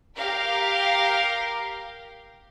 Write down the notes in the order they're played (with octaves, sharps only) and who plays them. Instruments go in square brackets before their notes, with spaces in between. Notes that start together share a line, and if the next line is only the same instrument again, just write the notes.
[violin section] G4 A#4 F5